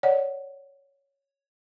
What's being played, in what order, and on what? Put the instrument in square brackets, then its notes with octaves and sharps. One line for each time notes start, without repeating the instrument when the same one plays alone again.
[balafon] C#5 D5 F#5